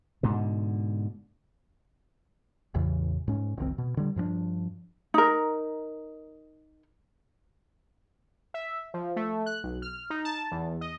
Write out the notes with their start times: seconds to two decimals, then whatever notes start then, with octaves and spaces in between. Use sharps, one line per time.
0.23 G#2 B2 D3
2.74 A1 E2 C#3 E3
3.28 G#2 C#4
3.57 F#1 C2 D#3 C4
3.78 B2
3.97 D3 G3
4.16 G2 F3 B3 D4
5.14 D#4 A#4
8.54 E5
8.94 F3
9.16 A3
9.46 F#6
9.64 B1
9.82 F6
10.10 D#4
10.25 A5
10.52 E2
10.81 D#5